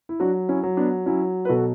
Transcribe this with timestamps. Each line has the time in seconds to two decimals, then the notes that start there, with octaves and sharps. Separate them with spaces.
0.09 E4
0.20 F#3 D4 F#4
0.49 C#4 E4
0.63 F#3
0.77 B3 D4
1.06 F#3 C#4 E4
1.45 B4
1.49 B2 F#4 A4